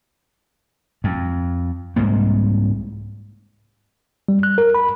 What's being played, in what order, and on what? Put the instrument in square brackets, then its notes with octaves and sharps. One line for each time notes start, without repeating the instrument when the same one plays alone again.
[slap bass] F2
C2 G#2 A#3
[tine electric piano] G3
F#6
A#4
B5